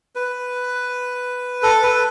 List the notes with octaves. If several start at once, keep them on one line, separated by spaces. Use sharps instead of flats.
B4
A4
B4